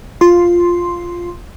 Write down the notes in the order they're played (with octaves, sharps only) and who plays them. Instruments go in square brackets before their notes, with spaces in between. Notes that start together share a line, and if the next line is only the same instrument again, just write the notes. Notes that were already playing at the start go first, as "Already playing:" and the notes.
[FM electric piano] F4 C6